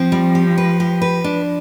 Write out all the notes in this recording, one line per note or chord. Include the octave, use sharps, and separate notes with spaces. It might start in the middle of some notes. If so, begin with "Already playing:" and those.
Already playing: F3 C4
G3
G4
B4
G4
B4
D4